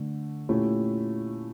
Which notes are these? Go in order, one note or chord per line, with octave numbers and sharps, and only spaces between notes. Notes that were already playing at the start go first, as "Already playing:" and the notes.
Already playing: D3 A3 D4
A#2 A3 C#4 E4 G4